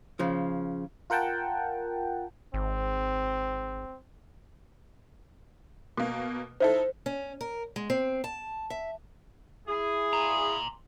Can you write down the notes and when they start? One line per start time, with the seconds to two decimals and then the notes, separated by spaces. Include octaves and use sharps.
0.19 C#3 F3
1.10 F4 A#4 F#5 G5 A5
2.54 G#1 C4
5.97 B2 A#3
6.60 D#4 E4 A4 C5
7.06 C#4
7.41 A#4
7.76 G#3
7.90 C4
8.24 A5
8.70 E5
9.67 E4 G#4
10.13 A#5 C6